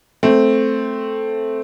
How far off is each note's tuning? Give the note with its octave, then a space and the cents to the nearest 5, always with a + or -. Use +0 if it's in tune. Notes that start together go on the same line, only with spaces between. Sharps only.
A3 +0 C4 +0